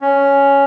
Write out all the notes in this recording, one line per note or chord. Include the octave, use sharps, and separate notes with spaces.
C#4